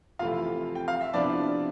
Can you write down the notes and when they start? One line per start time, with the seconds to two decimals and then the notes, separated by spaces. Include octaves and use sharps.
0.19 F2 C3 E3 A3 E4 F4 F5
0.75 G5
0.88 F5
1.01 E5
1.13 C3 F3 B3 D4 E4 D5